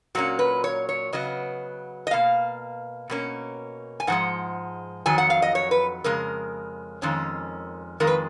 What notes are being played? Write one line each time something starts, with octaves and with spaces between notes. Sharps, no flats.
A#2 F#3 A#3 C#4 F#4
B4
C#5
C#5
C#3 F#3 B3 D#5
D#5
B2 A#3 F5
B2 A#3 C#4
G#5
G#2 F3 G#3 F#5
F2 D#3 F#3 G#5
F#5
F5
D#5
C#5
B4
F2 C#3 G#3 A#4
F2 D#3 G#3 C#4
F2 D#3 G#3 A#4
B4